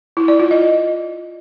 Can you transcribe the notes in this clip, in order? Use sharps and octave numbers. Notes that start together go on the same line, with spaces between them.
E4
D5
F4
D#5